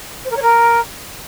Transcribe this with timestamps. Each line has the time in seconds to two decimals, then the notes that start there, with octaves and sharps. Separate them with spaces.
0.25 C5
0.30 A#4
0.36 C#5
0.42 A#4